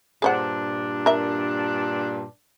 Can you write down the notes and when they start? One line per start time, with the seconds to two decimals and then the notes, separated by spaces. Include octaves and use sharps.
0.22 G2 A#2 D4 G#4 C5 F#5
1.06 A#4 E5